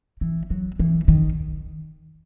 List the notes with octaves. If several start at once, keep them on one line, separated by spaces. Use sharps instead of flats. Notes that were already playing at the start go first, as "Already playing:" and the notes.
E3
F#3
E3
D#3